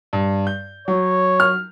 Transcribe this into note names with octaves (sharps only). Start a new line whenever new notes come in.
G2
G6
F#3 C#5
F6